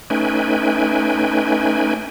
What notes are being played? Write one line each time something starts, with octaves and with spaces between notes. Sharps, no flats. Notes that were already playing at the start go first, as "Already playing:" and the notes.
A3 C#4 D#4 B4 G5 G#5